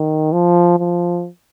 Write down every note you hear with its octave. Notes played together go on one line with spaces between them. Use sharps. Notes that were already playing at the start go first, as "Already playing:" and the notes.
Already playing: D#3
F3
F3